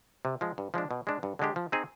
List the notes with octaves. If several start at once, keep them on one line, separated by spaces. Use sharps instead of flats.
C3
F3 G#3
G2
F3 G#3 D4
B2
G#3 D4
G2
D3 G#3 D4 G4
F3
C4 D#4 G#4